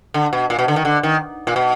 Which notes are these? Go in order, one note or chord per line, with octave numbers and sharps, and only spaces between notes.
D3
B2
A#2
B2
D3
D#3
D3
D#3
A#2
B2